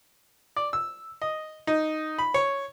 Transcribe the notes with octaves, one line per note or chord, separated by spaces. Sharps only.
D5
E6
D#5
D#4
B5
C#5